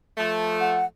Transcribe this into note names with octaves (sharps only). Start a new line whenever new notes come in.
F3 A3
F#5